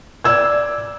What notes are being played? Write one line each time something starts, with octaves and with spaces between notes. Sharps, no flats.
D5 E6 G#6